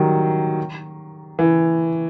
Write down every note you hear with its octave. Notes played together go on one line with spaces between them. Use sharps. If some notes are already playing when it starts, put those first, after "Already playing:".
Already playing: D#3 F#3 G3
E3